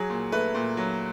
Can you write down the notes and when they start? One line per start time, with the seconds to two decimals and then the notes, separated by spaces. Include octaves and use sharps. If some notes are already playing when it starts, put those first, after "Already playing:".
Already playing: F#3 G#4
0.10 A#2
0.32 A3 B4
0.55 A#2
0.77 F#3